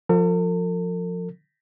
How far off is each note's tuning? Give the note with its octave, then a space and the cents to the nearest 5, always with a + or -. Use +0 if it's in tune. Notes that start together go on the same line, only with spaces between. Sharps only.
F3 +15 A4 +45